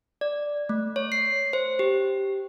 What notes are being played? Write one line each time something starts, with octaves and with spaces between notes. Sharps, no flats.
D5
A3
C#5
C7
C5
G4